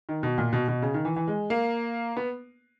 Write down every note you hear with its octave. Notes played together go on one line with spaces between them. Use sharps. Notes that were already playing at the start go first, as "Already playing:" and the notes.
D#3
B2
A#2
B2
B2
C#3
D#3
E3
E3
G#3
A#3
B3